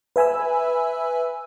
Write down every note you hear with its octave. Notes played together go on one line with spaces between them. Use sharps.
B4 E5 G#5 B5 E6